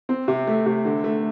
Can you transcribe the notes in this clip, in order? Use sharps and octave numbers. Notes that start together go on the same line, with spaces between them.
C4
C3
A3
C3
D3
A3